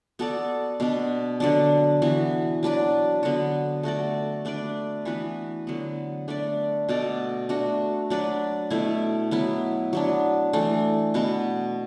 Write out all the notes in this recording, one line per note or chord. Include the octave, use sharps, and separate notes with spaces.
B3 F#4 A4 D5
B2 B3 D4
D3 F#3 D4
E3 B3 F#4
F#3 D4 B4 D5
D3 B3 F#4
A3 F#4 A4 D5
A3 D4 B4 D5
E3 B3 F#4 B4
D3 F#3 B3
A3 D4 B4 D5
B2 A3 F#4 D5
A3 D4 F#4
F#3 D4 B4 D5
B2 A3 E4
F#3 B3 E4
F#3 B3 D4
E3 A3 D4
B2 B3 F#4 B4